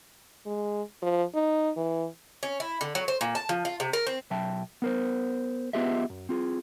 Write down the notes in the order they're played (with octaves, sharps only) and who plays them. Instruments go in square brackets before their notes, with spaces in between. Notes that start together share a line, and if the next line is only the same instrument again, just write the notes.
[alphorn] G#3
F3
D#4
E3
[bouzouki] C#4
E4
D3
F#3
C5
A#2
A5
F3
F4
C3
A#4
C4
[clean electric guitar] B1 F#3 E5 G5 A5
B3 A#4 C5
B3 F4 G4 G#4 D#5 E5
F#2
C4 F4 G#4